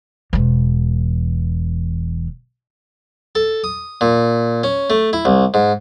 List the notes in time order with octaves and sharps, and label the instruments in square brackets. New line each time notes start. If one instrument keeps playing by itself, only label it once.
[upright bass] E1 E2
[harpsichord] A4
D#6
A#2
C#4
A3
E4
C2
G#2